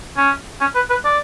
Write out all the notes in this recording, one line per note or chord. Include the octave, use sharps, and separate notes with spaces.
C#4
C#4
B4
B4
D5